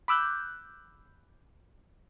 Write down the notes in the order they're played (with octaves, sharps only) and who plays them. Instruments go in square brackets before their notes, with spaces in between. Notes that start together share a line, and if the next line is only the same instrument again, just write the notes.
[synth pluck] B5 D6 E6 F#6 G6